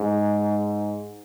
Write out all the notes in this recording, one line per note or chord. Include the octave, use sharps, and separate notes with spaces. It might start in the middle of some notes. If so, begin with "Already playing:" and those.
Already playing: G#2